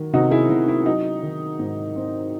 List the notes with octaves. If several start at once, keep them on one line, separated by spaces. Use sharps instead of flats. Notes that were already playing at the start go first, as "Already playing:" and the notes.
Already playing: D#3 F#3
C3 D#4 F#4
E4 G#4
C3 E4
E4
F#3 D#4
D#3
G#2
C4